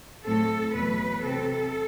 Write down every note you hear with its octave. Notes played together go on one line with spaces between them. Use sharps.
A2 F#3 A3 C4 A4
E2 B2 F#3 A3 B4
C3 F#3 C4 A4